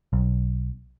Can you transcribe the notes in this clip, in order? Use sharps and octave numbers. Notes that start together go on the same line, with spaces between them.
B1